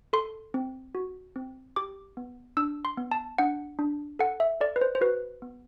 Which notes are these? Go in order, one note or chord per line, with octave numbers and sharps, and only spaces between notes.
A4 C6
C4
F#4
C4
G4 D6
B3
D4 E6
C6
B3
A5
D4 F#5
D4
A4 F#5
E5
A4 D5
B4
C5
C5
F#4 B4
B3